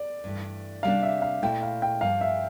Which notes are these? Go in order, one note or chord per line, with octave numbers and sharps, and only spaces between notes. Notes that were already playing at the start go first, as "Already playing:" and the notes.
Already playing: D5
G2 E3 A3
C3 G3 A#3 D4 F5
E5
F5
A#2 A3 E4 G5
F5
G5
G2 F3 A#3 F5
E5